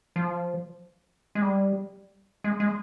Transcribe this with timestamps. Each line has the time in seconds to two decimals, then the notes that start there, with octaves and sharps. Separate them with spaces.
0.16 F3
1.35 G#3
1.42 G3
2.44 G#3
2.60 G#3